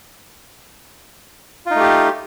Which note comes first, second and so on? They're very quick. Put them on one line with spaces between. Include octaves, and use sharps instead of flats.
F4 D#4 A3 G4